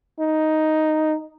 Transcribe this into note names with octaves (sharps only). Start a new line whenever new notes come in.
D#4